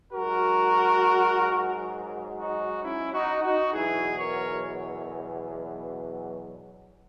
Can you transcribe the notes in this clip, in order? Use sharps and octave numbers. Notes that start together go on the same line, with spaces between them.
G#2 F#3 F#4 A#4
D#4 F#4
C#4 E4
D#4 F#4
D#4 F#4
E2 B2 F#3 E4 G#4
A#4 C#5